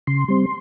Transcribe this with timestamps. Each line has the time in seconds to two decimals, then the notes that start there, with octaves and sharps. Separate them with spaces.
0.07 C#3 C6
0.28 G3 C4